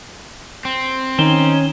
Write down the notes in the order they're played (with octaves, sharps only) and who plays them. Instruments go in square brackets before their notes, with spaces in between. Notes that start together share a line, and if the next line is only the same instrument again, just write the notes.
[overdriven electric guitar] C4
[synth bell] D#3 E7 G7 [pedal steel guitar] C#4 [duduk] D#4